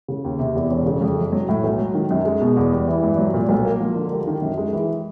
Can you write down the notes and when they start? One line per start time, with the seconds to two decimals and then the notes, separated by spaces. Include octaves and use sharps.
0.08 C#3
0.24 D#2
0.39 C3
0.55 E2
0.70 E1
0.86 C#3
1.01 F2
1.17 F#1
1.32 F#3
1.49 A2
1.64 B1
1.79 F#3
1.94 D#3
2.11 F#2
2.25 G#3
2.41 B2
2.57 E2
2.72 G3
2.88 E3
3.04 G2
3.18 F#3
3.34 A#2
3.49 B1
3.65 A#3
3.80 F3
3.96 D3
4.12 G3
4.27 D#3
4.42 F#2
4.58 G#3
4.73 E3